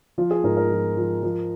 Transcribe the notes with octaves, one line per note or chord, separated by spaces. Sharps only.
F3 F4
G#4
G#2 A#4
A#4
F3
F3
F3